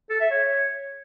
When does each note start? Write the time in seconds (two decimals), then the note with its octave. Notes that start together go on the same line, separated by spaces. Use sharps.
0.10 A4
0.20 E5
0.31 C#5